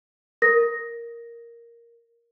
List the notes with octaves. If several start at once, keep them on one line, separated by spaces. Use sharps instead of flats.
A#4 A#6